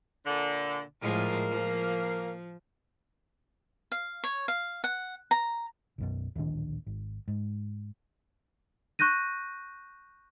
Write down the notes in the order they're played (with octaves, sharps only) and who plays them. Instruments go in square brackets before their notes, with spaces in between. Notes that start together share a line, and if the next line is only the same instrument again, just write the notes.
[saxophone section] A#2 D3
[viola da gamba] A2 F3 G#3 [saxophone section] A#3
[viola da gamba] F3
[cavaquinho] F5
C#5
F5
F#5
A#5
[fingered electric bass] B1 F#2 B2
D1 A#1 D#3 D4
G#1
G#2
[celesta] C#6 F#6 G6 A#6 D#7